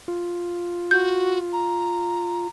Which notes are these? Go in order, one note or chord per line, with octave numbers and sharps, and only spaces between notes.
F4
F#4 G6
A#5